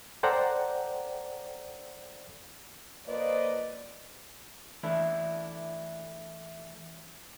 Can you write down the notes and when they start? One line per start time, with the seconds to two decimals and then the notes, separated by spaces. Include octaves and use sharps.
0.23 A4 C5 D5 F#5 G5 A#5
3.07 F3 A#3 B4 C5 D5 D#5
4.83 E3 A3 D4 E4